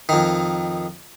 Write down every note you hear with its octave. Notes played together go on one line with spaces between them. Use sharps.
F2 D#3